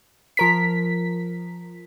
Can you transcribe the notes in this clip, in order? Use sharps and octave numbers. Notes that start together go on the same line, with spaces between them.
F3 A#4 B6